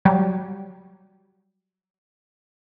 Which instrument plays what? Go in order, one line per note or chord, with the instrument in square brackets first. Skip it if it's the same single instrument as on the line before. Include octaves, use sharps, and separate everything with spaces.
[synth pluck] F#3 G3 G4